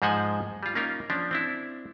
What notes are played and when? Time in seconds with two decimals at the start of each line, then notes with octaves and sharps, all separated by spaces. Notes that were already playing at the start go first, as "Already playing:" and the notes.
0.02 G#2 F3 G#3 C5 F#5 G#5
0.63 G3 F4
0.75 A#3 C#4 D#4 F4 A#4
1.10 F3 C#4 D4
1.31 C4 D4 E4